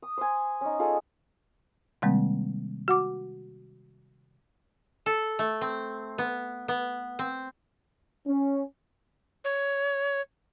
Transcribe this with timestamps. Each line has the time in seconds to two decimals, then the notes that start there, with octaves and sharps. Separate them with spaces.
0.02 D#6
0.17 C5 G#5
0.61 C#4 D#4
0.79 F4 G#4 A4 D#5
2.02 C3 D#3 G3 G#3 A#3 C4
2.88 F#4 F#5 D6
5.06 A4
5.39 A3
5.61 C4
6.18 B3
6.68 B3
7.19 C4
8.27 C#4
9.44 C#5